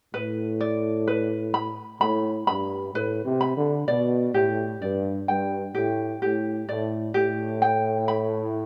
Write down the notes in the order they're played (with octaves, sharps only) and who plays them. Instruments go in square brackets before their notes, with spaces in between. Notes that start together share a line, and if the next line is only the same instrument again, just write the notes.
[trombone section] A2 [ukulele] B4
[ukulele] D5
B4
B5
[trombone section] A2 [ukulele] B5
[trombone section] G2 [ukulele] B5
[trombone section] A2 [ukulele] B4
[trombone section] C3
[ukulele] B5
[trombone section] D3
[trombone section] B2 [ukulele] D5
[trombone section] A2 [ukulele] G4
[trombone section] G2 [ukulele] D5
[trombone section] G2 [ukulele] G5
[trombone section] A2 [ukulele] G4
[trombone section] A2 [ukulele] G4
[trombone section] A2 [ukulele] D5
[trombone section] A2 [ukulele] G4
[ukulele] G5
B5